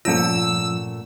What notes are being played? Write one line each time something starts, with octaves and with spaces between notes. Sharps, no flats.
G2 A#2 F3 A3 C#4 F4 F#5 E6